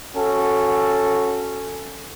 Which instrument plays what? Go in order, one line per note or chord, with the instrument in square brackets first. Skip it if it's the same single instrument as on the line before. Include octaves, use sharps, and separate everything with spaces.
[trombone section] C#4 F#4 A4